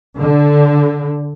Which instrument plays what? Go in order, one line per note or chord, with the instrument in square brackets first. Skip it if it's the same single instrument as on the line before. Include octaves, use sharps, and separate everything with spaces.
[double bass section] D3